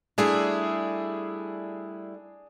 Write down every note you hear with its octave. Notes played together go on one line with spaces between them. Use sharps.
G3 A3 D4 E4 G#4